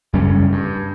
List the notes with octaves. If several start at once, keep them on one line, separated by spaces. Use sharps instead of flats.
F#2 C#3 G3 C#4
G2